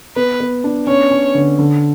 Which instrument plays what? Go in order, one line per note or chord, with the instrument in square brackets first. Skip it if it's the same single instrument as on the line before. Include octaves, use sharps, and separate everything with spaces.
[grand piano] B3 [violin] B4
[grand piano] B3
D4
[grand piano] C#4 [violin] C#5
[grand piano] C#4
D3
D3